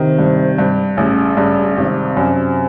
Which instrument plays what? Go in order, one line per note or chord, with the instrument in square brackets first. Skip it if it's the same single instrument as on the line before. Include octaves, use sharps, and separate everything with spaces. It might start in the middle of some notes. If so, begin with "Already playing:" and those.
Already playing: [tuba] C3 [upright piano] D#3
[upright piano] G2
G2
[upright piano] A1 [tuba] C#3
[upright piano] G2 [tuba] C#3
[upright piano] G#1 [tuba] C3
[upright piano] F#2